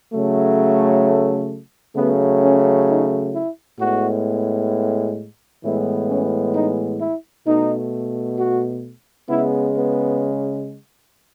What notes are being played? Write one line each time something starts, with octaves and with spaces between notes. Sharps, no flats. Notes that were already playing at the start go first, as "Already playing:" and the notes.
C#3 F#3 A3
C#3 F#3 A3 B3
C#4
D#4
E4
A2 G#3 B3 F#4
A2 E3 G#3 B3 E4
C#4
D#4
E4
B2 A3 D#4
F#4
C#3 G#3 B3 E4
B3